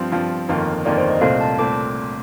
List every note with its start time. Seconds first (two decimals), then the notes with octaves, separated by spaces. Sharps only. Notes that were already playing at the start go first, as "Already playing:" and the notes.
Already playing: G2 F3 C4 F4
0.12 G2 F3 C4 F4
0.49 G1 F2 D#3 A#3 F4
0.85 G1 F2 D#3 A#3 F4 D5
0.97 C5
1.10 D#5
1.21 C2 A#2 A3 C4 F5
1.41 A5
1.58 A#2 A3 C4 D6